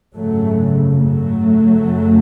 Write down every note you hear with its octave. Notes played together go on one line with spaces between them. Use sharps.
G#1 F#2 C#3 F#3 A3
F#3 A3
F#1 F#2 C#3